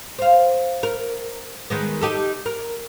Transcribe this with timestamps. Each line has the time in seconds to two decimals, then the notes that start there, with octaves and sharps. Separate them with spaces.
0.19 C5 F5
0.83 A#4
1.70 D#3 G#3 B3
2.01 D#4 G4 A4
2.46 A#4